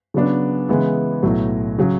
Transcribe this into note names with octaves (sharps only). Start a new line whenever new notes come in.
C#3 F#3 B3 D4
C#3 E3 G#3 B3 E4
B1 A2 F#3
C#3 F#3